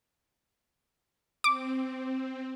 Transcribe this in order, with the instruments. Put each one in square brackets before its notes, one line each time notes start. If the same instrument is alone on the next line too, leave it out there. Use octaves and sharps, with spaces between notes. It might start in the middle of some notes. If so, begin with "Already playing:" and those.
[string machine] C4 [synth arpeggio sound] D6